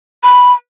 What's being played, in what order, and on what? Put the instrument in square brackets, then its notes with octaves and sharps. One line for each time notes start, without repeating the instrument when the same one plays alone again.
[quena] B5